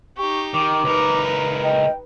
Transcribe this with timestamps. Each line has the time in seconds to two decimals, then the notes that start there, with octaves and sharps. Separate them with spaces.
0.18 D#4 G4 C#6
0.54 D#3 D6
0.84 C#2 D#4 A#4 B4
1.63 D#5 G5